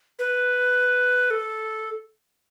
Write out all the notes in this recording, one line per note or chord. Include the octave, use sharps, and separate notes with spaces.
B4
A4